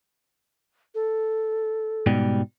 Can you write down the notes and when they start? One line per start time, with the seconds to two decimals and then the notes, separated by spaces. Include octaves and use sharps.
0.95 A4
2.06 G#2 B2 G3